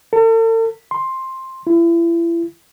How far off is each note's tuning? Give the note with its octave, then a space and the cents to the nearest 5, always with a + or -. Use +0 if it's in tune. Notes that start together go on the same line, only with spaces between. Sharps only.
A4 +45
C6 +10
E4 +35